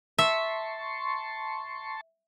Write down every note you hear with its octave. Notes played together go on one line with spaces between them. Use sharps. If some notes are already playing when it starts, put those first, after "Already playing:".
E5 A5 C6 C#6